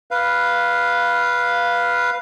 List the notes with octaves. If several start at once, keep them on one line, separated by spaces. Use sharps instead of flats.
B4 F5